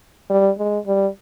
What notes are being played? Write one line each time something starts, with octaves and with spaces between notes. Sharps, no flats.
G3
G#3
G3